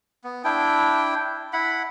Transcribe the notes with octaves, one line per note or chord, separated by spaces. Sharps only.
B3
D4 E4 G5
E4 F#5 B5